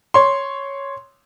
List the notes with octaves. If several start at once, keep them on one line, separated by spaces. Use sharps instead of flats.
C#5 C6